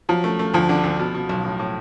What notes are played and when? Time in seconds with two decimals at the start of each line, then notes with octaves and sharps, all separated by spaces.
0.09 F3 F#3
0.24 A3
0.39 A3
0.54 D2 F3
0.69 D3
0.84 D2
0.99 B2
1.14 B2
1.29 B1
1.44 A2
1.59 A2